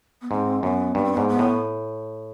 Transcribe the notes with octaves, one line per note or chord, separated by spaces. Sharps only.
B3
G#2 C4
F#2 B3
G2 B3
C4
G#2 B3
B3
A2